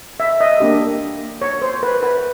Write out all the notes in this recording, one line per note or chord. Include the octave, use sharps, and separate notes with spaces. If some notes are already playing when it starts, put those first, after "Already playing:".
E5
D#5
A#3 D4 G4
C#5
C5
B4
B4